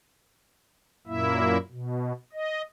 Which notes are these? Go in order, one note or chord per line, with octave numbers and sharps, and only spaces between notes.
F#2 A#2 A#3 E4 E5
B2
D#5